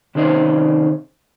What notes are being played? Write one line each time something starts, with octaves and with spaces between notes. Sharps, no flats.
C3 D#3 C#4 C5 D#5